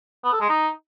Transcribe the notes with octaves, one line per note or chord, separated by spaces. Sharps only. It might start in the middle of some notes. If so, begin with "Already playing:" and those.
B3
A4
G#3
D#4